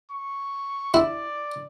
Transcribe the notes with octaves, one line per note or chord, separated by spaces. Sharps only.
C#6
E4 D5